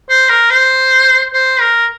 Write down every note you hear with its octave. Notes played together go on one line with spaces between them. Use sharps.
C5
A#4
C5
C5
A#4